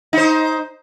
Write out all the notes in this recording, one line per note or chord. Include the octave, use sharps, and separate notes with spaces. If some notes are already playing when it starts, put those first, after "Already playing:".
D#4 C5